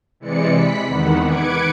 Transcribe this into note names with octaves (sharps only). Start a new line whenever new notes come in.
C3 E3 G#3 D5 C#7
B5 B6
E2 D#3 F#5
B4 D6 G#6 C#7 D7